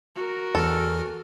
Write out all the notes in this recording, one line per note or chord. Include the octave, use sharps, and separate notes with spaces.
F#4 A#4
E2 E3 A4 F6